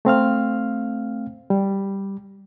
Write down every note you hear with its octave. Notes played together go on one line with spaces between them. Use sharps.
A3 C4 F5 F6
G3